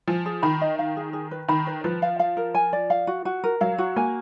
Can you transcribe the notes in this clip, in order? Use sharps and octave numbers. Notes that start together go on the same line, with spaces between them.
F3 G#5
G#4
D#3 B5
D#5
F5
G#4
G#4
B4
D#3 B5
B4
F3 B4
F5
F5
A#4
G#5
D5
F5
F#4
F#4
A#4
F#3 F5
F#4
A#3 G#5